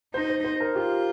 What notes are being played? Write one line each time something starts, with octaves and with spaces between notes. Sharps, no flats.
D#4 C5
C5
C5
A#4
F4 G4